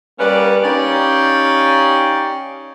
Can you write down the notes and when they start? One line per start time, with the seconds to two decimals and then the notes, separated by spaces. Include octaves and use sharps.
0.19 G3 A#3 C#4 B4 D5
0.64 C#4 D#4 G4 D5 F5